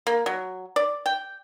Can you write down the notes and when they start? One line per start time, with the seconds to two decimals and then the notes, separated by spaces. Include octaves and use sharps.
0.07 A#3
0.26 F#3
0.76 D5
1.06 G5